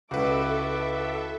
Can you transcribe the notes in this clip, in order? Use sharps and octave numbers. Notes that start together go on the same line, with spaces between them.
C#2 E4 F#4 A4 B4 E5 D6